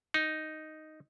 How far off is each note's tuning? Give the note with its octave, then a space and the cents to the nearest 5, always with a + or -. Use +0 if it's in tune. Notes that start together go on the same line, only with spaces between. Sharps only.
D#4 +0